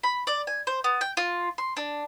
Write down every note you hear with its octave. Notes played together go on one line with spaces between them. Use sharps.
B5
D5
G#5
C5
B3
G5
F4
C6
D4